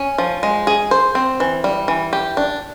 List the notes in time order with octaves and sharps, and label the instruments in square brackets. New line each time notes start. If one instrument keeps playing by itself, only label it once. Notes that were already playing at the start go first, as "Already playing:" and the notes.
Already playing: [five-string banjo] C#4
F3
G#3
G#4
C5
C4
E3
G3
E3
G4
D4